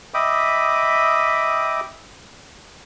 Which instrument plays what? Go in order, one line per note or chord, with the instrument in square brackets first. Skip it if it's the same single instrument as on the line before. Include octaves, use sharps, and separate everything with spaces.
[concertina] D#5 E5 G5 B5 D6 D#6